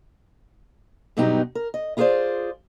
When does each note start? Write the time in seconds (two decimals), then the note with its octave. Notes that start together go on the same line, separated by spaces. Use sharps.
1.17 G2 B2 F#3 B3 D#4 G4
1.55 A#4
1.74 D#5
1.97 E4 F4 G#4 B4 C5 D5